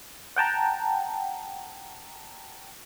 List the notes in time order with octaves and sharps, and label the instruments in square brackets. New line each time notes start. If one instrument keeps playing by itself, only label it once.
[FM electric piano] F#5 G5 A5 A#5